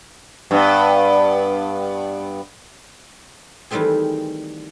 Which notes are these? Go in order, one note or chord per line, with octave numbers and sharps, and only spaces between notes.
G2 B3
D#3 E3 G3 A3 C4 G#4